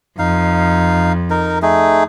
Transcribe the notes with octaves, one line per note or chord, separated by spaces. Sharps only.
F2 D#4 F5
D#4 A#4
A3 D#4 G#4